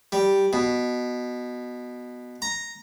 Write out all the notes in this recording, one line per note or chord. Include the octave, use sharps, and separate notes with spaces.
G3
B2
A#5